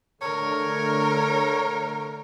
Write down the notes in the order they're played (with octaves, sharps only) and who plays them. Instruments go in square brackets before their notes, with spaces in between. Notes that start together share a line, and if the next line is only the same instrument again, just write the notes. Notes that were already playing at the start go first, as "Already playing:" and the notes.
[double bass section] D3 A3 [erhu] A#4 [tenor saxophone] C#5